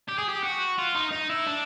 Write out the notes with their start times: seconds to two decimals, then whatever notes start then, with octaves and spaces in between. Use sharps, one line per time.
0.09 G4
0.18 G#4
0.29 G4
0.43 F#4
0.78 F4
0.95 D#4
1.11 D#4
1.30 E4
1.46 D4